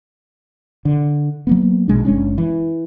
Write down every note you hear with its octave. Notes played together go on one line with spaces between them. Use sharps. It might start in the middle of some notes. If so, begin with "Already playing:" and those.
D3
F#3 A#3 B3
A#1 B2 G#3 D4
F#1 G#3 C#4 D4
E3